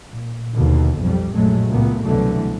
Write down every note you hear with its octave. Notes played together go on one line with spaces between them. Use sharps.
A#2
D#2 B2 D3
B1 F2 G3
A#1 F#2 A#2 F#3 G#3 A3
C#2 A#2 A3 B3
C2 B2 D3 E3 F#3 A3